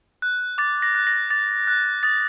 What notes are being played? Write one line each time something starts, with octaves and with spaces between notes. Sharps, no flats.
F#6
D6 A6
A#6
F#6
A#6
D6 A6
F#6
D#6 A6